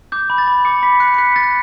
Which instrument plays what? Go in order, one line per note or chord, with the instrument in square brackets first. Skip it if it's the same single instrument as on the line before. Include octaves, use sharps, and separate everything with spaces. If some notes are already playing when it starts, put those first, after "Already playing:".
[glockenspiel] D6 G6
B5
A6
B5
D6 C#7
B5 B6
F#6 C#7
C#7
F#6 B6
F#6 A6